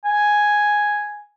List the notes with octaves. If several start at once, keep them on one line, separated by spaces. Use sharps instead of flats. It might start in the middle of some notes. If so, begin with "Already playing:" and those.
G#5